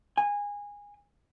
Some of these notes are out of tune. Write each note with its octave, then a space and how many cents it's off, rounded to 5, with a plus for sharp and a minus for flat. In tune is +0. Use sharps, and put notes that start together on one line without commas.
G#5 -20